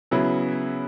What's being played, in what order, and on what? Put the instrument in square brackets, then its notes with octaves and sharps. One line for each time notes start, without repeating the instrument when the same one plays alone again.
[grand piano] C#3 F#3 B3 E4